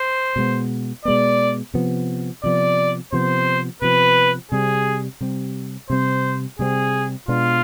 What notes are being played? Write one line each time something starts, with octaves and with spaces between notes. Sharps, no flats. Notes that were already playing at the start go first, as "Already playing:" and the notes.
Already playing: C5
B2 G#3 B3
B2 G#3 B3 D5
C3 F3 B3
C3 F3 B3 D5
C3 F3 B3 C5
C3 F3 B3 B4
C3 G3 C4 G#4
C3 G3 C4
C3 G3 C4 C5
C3 G3 C4 G#4
B2 G#3 B3 D4 F4